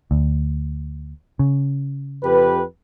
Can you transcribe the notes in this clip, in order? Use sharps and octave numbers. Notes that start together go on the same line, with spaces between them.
D2
C#3
F2 G4 B4